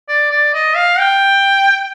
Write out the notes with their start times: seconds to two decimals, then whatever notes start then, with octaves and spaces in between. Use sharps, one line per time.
0.09 D5
0.31 D5
0.54 D#5
0.76 F5
0.99 G5